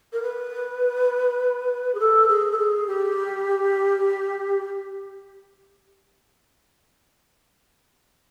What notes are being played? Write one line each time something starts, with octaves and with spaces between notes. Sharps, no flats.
A#4
B4
G#4
A4
G#4
A4
G#4
G4